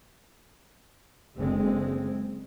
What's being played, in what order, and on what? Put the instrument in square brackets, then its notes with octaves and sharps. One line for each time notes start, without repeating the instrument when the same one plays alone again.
[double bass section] F#1 D3 G#3 C4